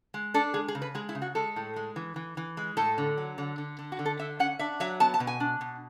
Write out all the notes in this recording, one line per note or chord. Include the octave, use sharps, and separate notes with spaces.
G#3
D4 A4
G#3 G#4
G#4
C#3
B4
G#3 G#4
E4
C#3
F#4
G#3 A4
A2
G#3
E3
E3
E3
G#3
A2 A4
D3
F#3
D3
D3
D3
F#4
D3
A4
D3 E5
C#4 F#5
D4 E5
F#3 E5
B3 A5
A5
B2
G#5
D4
B2